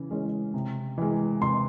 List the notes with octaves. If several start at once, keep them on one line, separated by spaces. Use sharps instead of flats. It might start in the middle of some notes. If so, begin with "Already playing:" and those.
Already playing: C#3 E3
E3 G#3 C#4
C3
E3 G#3
C3 C6